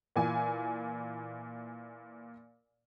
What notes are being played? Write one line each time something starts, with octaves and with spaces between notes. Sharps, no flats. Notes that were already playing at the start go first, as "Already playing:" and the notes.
A#2 E3 G#5